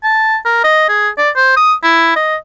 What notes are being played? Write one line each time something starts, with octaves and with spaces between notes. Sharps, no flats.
A5
A#4
D#5
G#4
D5
C5
D#6
E4
D#5